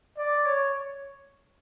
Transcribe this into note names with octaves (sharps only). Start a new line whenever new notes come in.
D5
C#5